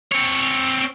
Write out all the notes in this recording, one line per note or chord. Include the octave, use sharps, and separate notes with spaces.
C4 C#5